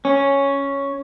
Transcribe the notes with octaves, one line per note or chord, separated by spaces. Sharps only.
C#4